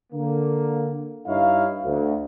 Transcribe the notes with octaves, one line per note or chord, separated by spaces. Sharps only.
D3 A#3
G2 D#4 E4 C#5 F5
D2